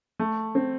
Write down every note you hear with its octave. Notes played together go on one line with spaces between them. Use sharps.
A3
C4